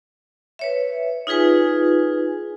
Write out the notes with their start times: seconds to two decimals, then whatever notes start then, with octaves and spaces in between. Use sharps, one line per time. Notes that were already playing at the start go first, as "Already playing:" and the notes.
0.59 B4 C#5 E5
1.27 D#4 F4 G#4 B4 G#5